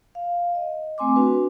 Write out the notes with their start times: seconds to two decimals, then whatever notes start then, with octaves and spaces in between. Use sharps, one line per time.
0.15 F5
0.55 D#5
0.98 A3 C4 G#5 C6 D6
1.16 D4 F#4 B4